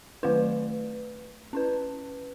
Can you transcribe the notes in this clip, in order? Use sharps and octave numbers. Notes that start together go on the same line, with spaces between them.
D#3 F#3 A3 E4 B4
C#4 E4 B4